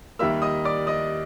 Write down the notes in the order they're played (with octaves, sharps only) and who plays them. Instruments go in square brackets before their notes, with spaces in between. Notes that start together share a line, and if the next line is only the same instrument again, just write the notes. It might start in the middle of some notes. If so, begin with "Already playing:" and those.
[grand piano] D#2 D#3 G3 A#3 E5 E6
D#5 D#6
D5 D6
D#5 D#6